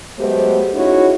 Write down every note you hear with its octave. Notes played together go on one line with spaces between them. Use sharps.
F#3 G#3 A3 B3 G4 C5
C#4 D#4 E4 F#4 G#4 C#5